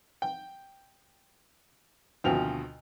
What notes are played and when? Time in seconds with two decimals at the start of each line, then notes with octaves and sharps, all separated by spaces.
0.22 G5
2.24 D2 B2 D#3 F3 C4 F7